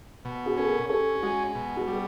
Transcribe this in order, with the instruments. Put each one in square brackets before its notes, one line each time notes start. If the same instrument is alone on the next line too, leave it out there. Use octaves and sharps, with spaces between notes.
[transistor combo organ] B2
[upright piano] F#4 G#4
[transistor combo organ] C#4 [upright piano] A4
[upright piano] G#4 A#4
[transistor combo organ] C#4 [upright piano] G4 A4
[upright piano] G4
[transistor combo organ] G#3 [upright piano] F#4 G#4
[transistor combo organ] B2
[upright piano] F#4 G#4
[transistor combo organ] G3 [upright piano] G#4